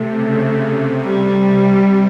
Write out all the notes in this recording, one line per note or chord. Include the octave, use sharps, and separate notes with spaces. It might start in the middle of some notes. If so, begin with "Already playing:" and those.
Already playing: C3 A3
C#3
C3
G3